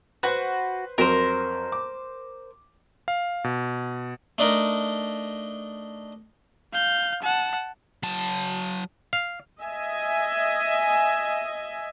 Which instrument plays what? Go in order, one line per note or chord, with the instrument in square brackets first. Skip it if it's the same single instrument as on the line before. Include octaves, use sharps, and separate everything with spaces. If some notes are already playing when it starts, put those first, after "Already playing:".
[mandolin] F#4 [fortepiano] B4 C5
[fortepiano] F2 F#3 [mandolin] A#4 C5
[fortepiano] D6
[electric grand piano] F5
B2
[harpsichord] A3 D4 D#4 A#4
[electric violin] F5 G6
F#5 A5
[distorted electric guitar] F#3 A5
[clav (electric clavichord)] F5
[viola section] D#5 E5 G#5